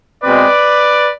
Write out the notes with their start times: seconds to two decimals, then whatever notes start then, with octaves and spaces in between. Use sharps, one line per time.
0.23 B2 G#3 C4 B4 D5